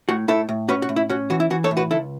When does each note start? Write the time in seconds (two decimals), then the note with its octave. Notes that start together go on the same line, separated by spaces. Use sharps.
0.09 A2 F#4
0.28 A2 E4 A4
0.49 A2
0.69 C#4 F#4 B4
0.82 F#4
0.89 A2
0.96 E4
1.09 C#4 F#4
1.30 E3 F#4
1.40 E4
1.50 E3 F#4
1.64 A4 C#5
1.71 A2
1.77 F#4 B4
1.91 C#2 E4 A4